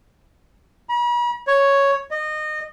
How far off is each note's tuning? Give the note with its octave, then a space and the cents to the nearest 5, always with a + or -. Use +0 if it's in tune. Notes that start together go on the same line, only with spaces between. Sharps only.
B5 -45
C#5 +0
D#5 -25